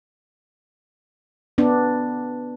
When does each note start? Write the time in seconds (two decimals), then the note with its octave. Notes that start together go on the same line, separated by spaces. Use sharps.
1.58 B3 D4